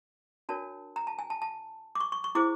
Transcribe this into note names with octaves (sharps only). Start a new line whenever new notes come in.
D4 F#4 A#4 C#5 A5
A#5
A5
G#5
A5
A5
D6
C#6
C#6
C#6
E4 G#4 C5 D6